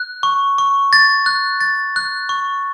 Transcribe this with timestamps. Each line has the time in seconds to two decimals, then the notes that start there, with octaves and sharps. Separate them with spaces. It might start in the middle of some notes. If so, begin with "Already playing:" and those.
Already playing: F#6
0.23 C#6
0.58 C#6
0.93 A6
1.26 F#6
1.61 A6
1.96 F#6
2.29 C#6